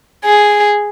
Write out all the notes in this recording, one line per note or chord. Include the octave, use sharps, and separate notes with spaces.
G#4